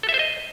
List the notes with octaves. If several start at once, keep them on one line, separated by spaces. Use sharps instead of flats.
A4
E5
C5
D#5